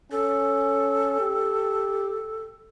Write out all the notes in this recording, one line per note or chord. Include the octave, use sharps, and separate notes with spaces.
C#4 A4
G4